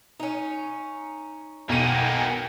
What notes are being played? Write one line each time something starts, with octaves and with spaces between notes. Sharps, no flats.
C#4 D#4
B1 A#3 B3 G5 G#5 D#7